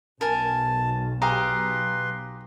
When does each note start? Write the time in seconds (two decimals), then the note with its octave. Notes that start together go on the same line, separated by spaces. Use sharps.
0.21 B1 A#4 G#5 A5
1.22 G4 G#4 B4 F5 A#5 C6